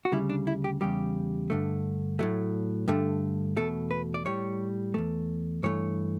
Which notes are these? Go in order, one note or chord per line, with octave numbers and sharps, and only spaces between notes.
F#4
D2 C#3 G3 E4
D4
E4
G4
E2 C#3 G3 G4
G2 D3 A3
A2 F#3 A3
G2 D3 A3
E2 B2 A3 A4
B4
D5
A2 G3 C#5
E2 B2 A3
G2 E3 A3 C#5